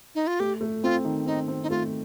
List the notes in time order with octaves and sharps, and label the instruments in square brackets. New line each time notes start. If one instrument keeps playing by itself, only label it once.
[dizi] D#4
F4
[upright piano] A3 [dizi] G4
[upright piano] A3
[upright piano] C4 [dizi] F4
[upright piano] D#3
[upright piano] C4 [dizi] D#4
[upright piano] C4
[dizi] D#4
[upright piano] A3 [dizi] F4